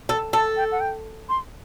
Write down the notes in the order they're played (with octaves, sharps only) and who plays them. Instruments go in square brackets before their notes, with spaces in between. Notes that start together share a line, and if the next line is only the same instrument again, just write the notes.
[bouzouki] A4
[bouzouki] A4 [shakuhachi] A5
[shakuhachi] G5
F#5
G5
C6